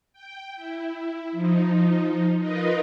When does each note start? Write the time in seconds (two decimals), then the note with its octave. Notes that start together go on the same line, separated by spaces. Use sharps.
0.13 G5
0.56 E4
1.32 F3 D#4
2.39 D#4 F4 A#4 B4 D#5